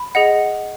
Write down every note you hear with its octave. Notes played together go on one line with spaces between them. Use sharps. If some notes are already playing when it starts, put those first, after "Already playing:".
Already playing: B5
G#4 D#5 F#5